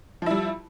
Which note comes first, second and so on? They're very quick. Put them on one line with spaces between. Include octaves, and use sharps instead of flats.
F3 E4 G3